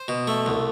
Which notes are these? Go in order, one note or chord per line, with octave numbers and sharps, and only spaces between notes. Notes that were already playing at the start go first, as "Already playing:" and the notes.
Already playing: C5
B2
A3
C2